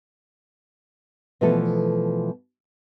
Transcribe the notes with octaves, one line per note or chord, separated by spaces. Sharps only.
B2 E3 F3 A3 B3 A4